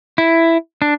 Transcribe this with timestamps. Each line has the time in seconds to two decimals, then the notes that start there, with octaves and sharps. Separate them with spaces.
0.18 E4
0.82 D4